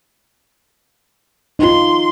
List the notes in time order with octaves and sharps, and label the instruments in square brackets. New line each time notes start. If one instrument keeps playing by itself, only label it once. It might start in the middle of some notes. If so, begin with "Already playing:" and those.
[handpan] D#4 F4 [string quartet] C6